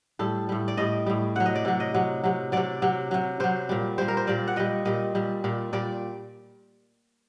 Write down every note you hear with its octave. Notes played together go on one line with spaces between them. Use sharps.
A2 G3 A4
A2 G3
D5
A2 G3 D#5
A2 G3
C3 F#3 F#5
D#5
D5
C3 F#3
D#5
C3 F#3
C3 F#3
C3 F#3 D5
C3 F#3
C3 F#3
C3 F#3 C5
A#2 G3
A#2 G3 C5
A#4
C5
A#2 G3 D5
F#5
A#2 G3 D#5
A#2 G3 D#5
A#2 G3
A#2 G3
A#2 G3 D5